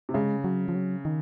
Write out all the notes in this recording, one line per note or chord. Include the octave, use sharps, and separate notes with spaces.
C3
C#3 G#3
F#3
F3
F#3
D#3